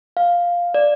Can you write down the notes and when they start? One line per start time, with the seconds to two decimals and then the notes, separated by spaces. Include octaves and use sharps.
0.17 F5
0.74 D5